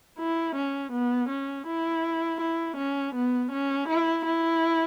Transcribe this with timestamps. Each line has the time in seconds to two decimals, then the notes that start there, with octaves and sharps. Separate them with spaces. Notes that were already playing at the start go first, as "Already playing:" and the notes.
0.19 E4
0.56 C#4
0.93 B3
1.29 C#4
1.67 E4
2.41 E4
2.77 C#4
3.15 B3
3.52 C#4
3.89 E4
4.26 E4